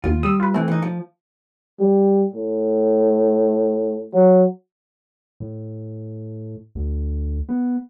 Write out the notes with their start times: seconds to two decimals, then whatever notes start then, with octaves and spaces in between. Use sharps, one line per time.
0.04 D#2 F4
0.23 G3 D#6 E6
0.40 F4 B4
0.54 E3 A3 C4
0.68 E3 D#4
0.82 F3
1.79 G3
2.34 A2
4.13 F#3
5.40 A2
6.75 D2
7.49 B3